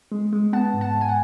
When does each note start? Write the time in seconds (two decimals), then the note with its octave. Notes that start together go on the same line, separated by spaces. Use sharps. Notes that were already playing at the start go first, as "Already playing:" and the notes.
0.12 G#3
0.33 G#3
0.53 B3 F#5 A5
0.74 G#2
0.81 F#5 A5
0.95 G#2
1.01 G#5
1.09 F#5